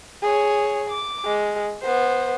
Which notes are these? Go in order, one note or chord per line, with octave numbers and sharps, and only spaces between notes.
G#4 C#5
D6
G#3
B3 C5